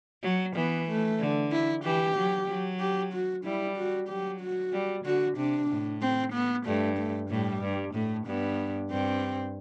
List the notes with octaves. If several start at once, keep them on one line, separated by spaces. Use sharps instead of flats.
F#3
E3 B3
A3
D3
E4
E3 G4
F#3
F#3
G4
F#4
G3 E4
F#4
F#3 G4
F#4
G3
D3 F#4
C3 D4
A2
C4
B3
G2 A3
A3
A2 G3
G2
A2 A3
G2 B3
G2 C4